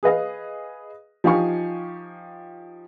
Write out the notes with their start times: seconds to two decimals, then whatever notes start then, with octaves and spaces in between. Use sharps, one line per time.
0.03 G#4 B4 D#5 F5
1.24 F3 D#4 G4 F5 G#5 C#6